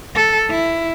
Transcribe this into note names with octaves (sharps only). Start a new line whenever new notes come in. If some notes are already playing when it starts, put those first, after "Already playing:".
A4
E4